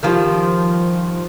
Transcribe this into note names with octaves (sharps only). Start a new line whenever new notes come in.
D#3 F3 G3